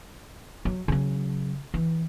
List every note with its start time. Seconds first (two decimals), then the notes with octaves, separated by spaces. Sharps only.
0.65 F#3
0.88 C#3 F#3
1.74 E3